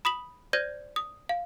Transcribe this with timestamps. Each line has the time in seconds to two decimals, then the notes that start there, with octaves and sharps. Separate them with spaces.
0.05 B5 D#6 B6 F#7
0.53 C5 D5 G6 G#6 A#6 D#7
0.96 D#6
1.29 F5